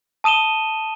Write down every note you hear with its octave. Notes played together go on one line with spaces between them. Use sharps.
A5 D#6 D#7 E7 G7